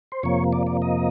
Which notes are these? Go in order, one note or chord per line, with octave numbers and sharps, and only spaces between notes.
C5
F2 C3 F3 A#3 C#5
D5
D5
D#5